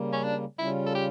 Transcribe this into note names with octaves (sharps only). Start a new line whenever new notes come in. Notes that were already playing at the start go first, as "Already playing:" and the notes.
Already playing: C#3 G3 A#3
C#4
D4
C#3 G3 C#4 E4 F4
A4
G4